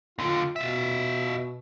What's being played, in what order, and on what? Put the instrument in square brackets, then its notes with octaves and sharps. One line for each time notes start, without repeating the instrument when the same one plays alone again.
[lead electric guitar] D#2 D3 [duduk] F4
[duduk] B2 [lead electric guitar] F4 E5